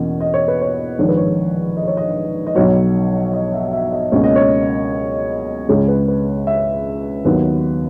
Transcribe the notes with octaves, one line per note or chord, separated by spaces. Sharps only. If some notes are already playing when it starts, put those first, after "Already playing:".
Already playing: E2 B2 A#3 C#4
D#5
C#5
B4
C#5
A#1 G#2 D#3 C#5
B4
C#5
D#5
C#5
D#5
D#5
B1 B2 F#3 C#5
D#5
E5
E5
D#5
C#2 B2 A#3 C#4 C#5
D#5
C#5
C#2 C#3 G#3 C#5
B4
B4
E5
D#2 D#3 F#3 B3 B4